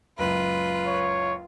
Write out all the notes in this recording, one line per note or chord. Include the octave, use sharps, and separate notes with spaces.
F#1 C#2 F#2 F4 B4
C#5